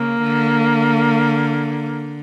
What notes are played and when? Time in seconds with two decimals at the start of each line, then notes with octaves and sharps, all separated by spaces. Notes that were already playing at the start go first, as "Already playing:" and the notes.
Already playing: C#3 A#3
0.23 D3